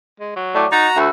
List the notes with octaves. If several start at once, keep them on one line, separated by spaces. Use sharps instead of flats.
G#3
F#3
A2 D5 C#6 D6
D#4 F#4 A#5 A6
D2 E5 B5 E6